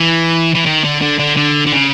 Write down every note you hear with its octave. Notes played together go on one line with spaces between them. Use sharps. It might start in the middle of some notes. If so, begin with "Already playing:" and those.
Already playing: E3
E3
D#3
D3
D3
D3
D3
D3
C#3